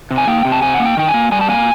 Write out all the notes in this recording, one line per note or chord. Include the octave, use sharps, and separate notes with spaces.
C3
G#5
A#3 G5
C3
A5
C3 G#5
F#5
A#3
G5
D#3 G5
G#5
A#3
G3 G#5
A5
A#3 G#5